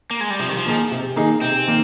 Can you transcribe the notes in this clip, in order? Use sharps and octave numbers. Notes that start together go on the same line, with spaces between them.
A#3
G#3
G3
C3 F3
D#3
F3
D#3 A#3 D#4 G#4
C3
D#3 A#3 D#4 G#4
C3 C4
D#3 A#3